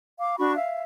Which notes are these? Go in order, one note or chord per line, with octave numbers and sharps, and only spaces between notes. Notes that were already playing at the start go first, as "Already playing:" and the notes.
F5 D6
D4 F#4 B5 C#6
E5 F5